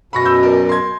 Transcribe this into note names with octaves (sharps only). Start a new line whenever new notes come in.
F#2 B2 B5 C#6 A#6
B5 E6 G6
A#4 D5
C6 G#6